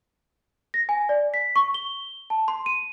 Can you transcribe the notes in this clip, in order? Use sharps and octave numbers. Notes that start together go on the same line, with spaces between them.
A#6
G#5
D5
B6
C#6
G7
A5
C6
D#7